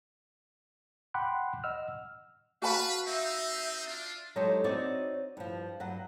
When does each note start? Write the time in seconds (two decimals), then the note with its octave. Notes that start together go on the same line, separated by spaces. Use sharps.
1.14 F#5 G5 B5 C6 D6 F#6
1.64 D#5 F#5 E6 F6
2.62 F#4 B4 F5 A5 B5
3.07 C4 D#4 E5
3.87 D4 F4
4.36 F#3 G#3 D#4 G4 A4 C5
4.64 C4 D#4 F#4 C#5 D5
5.37 G2 F3
5.80 G2 F#3 F#5